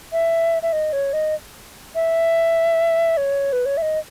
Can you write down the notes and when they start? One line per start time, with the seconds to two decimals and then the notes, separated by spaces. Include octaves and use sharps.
0.12 E5
0.62 E5
0.72 D#5
0.93 C#5
1.13 D#5
1.95 E5
3.17 C#5
3.52 B4
3.66 C#5
3.77 E5
3.82 D#5